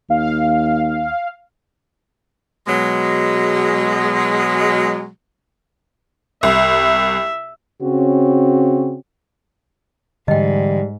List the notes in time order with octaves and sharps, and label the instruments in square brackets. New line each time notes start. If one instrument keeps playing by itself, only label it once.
[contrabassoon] D#2 [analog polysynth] F5
[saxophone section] B2 F#3 G#3
[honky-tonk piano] C2 [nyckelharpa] E5
[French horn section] C#3 C4 C#4 F#4
[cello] G#2 [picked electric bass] D3 E3 [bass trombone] G3 [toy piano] D#5 G5